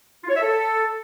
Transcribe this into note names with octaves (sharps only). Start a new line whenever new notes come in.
F4
C#5
E5
A4